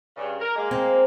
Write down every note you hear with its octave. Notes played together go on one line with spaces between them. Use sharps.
G2 C#3
A#4
G#3 A#3
C4